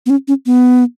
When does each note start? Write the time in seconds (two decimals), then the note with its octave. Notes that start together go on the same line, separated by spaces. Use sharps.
0.06 B3
0.10 C#4
0.28 C#4
0.46 B3